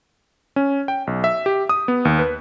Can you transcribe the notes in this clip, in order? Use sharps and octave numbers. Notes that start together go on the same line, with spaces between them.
C#4
G5
B1
E5
G4
D#6
B3
D#2
B4